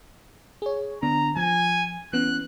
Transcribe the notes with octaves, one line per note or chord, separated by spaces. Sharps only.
G#4 C#5
D3 B3 D4 A#5
F3 G#5
E3 B3 C#4 F#6